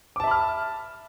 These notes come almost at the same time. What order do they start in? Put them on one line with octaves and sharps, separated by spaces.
D6 A5 E5 B5 F6